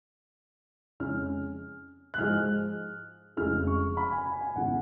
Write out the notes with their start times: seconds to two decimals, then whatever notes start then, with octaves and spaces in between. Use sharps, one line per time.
1.00 F2 C#3 G#3 C#4 F6
2.14 F#6
2.18 G#2 F3 G#3 F6
3.37 F1 F2 C#3 G#3 F6
3.67 C#6
3.97 B5
4.11 G#5
4.26 G#5
4.41 G#5
4.56 G#1 C#3 G#3 B3 F#5